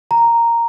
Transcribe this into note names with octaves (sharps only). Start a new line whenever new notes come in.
A#5